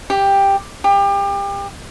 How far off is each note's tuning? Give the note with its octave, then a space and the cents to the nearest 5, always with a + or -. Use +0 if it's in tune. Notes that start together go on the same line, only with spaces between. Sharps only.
G4 +10
G4 +30